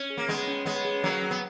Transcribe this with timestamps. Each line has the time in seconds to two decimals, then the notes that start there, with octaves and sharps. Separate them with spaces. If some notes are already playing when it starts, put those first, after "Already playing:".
Already playing: C#4
0.10 G#4
0.17 A#3
0.28 G#3 B3 C#5
0.48 C#4
0.66 G#3 B3 C#5
0.85 G#4
1.03 F#3 A#3 C#4
1.21 C#4
1.31 B3